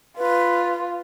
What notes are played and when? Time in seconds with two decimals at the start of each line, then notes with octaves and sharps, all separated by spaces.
0.18 F4 B4